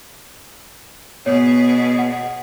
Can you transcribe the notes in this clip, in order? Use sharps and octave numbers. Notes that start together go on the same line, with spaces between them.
B2 B3 G#4 C#5
F#5